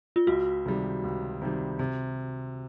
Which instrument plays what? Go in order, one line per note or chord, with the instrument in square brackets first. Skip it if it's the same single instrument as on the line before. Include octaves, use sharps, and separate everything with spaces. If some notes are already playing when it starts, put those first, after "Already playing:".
[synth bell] F4
[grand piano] C#2 [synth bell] F#4
[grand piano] C3 D#3 G3
C#2
C3 D#3 G3
C3